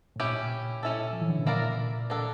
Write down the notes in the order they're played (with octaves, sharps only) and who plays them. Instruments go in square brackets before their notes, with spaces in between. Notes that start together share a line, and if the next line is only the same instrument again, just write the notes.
[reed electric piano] A2
[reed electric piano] A#2 [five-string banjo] C#4 E4 G4
[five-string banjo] C#4 E4 A4
[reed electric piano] F3
E3
D3
C#3
[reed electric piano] A#2 [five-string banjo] A#3 E4 A#4 D5
[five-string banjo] A#3 D4 A4